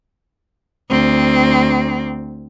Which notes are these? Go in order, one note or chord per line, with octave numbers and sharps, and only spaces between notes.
D2 C4